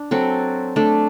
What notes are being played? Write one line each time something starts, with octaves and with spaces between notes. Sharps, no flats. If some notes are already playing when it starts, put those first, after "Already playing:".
Already playing: D4
F#3 C4 F#4 A4
A3 D4 A4